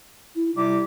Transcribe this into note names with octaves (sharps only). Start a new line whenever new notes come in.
E4
C3 G3 E4 D6